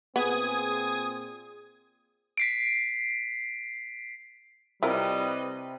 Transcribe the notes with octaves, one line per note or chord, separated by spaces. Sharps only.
A#2 B3 C4 G#4 D#6 G#6
B6 C7 D7
C3 G3 E4 F4 A#4 B4 D#5